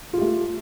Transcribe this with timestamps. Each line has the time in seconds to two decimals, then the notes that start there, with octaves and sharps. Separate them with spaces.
0.13 F4
0.17 G4
0.21 A3